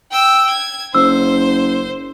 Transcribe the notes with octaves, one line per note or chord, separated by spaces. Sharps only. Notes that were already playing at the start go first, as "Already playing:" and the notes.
G5 E6
G#6
F#1 C5 E6